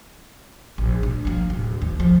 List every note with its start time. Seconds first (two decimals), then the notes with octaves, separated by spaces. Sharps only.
0.78 A#1
1.03 D4
1.25 F3 A#3
1.50 D1
1.82 D#2
2.00 F3